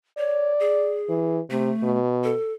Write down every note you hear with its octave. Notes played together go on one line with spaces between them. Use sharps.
C#5 D5
G#4
E3
C3 A3
B2
A4